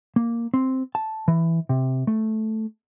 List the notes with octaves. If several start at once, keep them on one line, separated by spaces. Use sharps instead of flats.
A#3
C4
A5
E3
C3
A3